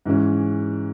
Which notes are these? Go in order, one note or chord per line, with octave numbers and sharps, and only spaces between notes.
G#2 E3 G#3 C#4